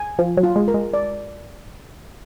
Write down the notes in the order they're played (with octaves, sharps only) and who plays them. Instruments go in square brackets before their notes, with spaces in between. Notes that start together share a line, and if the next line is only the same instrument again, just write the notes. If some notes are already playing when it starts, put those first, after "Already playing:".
Already playing: [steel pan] G#5
[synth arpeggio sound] F3 [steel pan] F4
[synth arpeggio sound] F#3
[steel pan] F4
[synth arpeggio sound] G#3
[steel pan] A#4
[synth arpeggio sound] G#3
[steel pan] D5